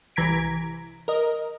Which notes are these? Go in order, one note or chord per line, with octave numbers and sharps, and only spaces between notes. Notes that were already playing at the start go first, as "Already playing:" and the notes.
C2 E3 A#5 G#6 B6 D7
A#4 D#5